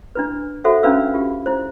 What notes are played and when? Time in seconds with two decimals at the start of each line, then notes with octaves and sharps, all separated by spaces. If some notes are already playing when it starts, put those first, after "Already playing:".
0.15 D4 E4 B4
0.64 F#4 A4 C5 E5 F#5
0.83 C#4 D4 E4 B4 F5 E6
1.14 F4 G4
1.46 E4 C5